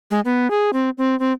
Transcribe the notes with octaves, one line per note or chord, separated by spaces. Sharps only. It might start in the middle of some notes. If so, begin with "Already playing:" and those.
G#3
B3
G#4
C4
C4
C4